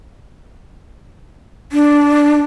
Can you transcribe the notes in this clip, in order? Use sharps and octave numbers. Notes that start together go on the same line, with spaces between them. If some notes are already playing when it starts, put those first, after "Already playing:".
D4